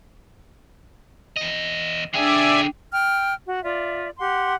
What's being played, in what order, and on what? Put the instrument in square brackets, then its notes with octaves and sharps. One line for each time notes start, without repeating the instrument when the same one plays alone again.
[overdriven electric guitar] E2 D#5
[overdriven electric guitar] D3 G#4 [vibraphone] D4 G5 [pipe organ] D5 E5 G#5
[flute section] G5 F6
F#4
F4 D5 E5
G4 F#5 C6